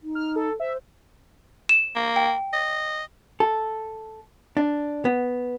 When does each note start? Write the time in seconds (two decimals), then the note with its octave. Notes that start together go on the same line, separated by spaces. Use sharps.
0.03 D#4
0.15 F6
0.36 A4
0.60 C5 E5
1.69 E7
1.96 A#3
2.16 G5
2.53 D#5
3.40 A4
4.57 D4
5.05 B3